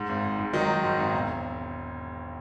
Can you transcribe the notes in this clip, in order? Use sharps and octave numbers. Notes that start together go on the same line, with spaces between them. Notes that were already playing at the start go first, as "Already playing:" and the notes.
Already playing: G#2
G#1
G#1
G#2
D#3 F#3 D#4
F#3
G#2
G#1
E1